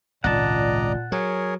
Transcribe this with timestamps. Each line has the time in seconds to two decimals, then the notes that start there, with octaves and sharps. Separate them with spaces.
0.24 G#1 C#2 A#2 D5 D#5 F#5 A5 A#5
1.12 F#3 G#4 A#4 C#5